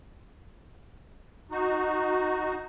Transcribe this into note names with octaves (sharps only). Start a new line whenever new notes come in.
D#4 F#4